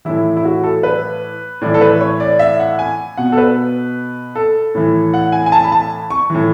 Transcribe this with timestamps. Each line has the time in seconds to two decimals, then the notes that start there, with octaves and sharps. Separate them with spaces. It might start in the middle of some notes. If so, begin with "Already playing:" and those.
0.05 A2 E3 E4
0.37 E4
0.45 F#4
0.64 A4
0.83 B4
1.61 A2 E3 D5
1.74 A4
1.81 B4
2.01 C#5
2.20 D5
2.39 E5
2.59 F#5
2.79 G#5
3.17 B2 F#5
3.32 A4
3.37 B4
4.35 A4
4.75 A2 E3
5.14 F#5
5.32 G#5
5.46 G#5
5.52 A5
5.64 B5
5.72 A5
6.10 C#6
6.30 A2 E3